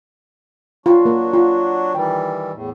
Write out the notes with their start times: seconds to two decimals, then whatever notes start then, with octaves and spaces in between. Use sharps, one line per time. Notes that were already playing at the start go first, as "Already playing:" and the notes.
0.86 F#3 D4 F4 F#4
1.05 A#3 A#4
1.33 F4
1.95 D#3 E3 G3 G5
2.52 E2 A2